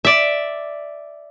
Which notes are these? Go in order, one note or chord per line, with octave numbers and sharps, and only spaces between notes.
D5 E5